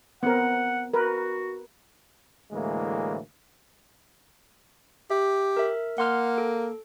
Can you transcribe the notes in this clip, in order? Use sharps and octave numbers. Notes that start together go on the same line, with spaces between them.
B3 C4 A#4 F#5
F#4 A#4 B4
D2 A2 E3 G#3 A#3
G4 E5
A#4 E5
A#3 F#5 C6 F6
A4